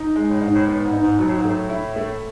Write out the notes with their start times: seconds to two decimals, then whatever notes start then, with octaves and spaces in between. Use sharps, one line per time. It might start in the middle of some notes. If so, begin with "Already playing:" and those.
Already playing: D#4
0.16 G#3
0.28 A2
0.41 G#2 D#4
0.54 A2
0.67 A2 B3
0.84 G#2
0.93 D#4
1.01 G#2
1.19 B2 F#3
1.28 A2
1.38 G#2
1.45 A2 A3
1.69 E4
1.96 A3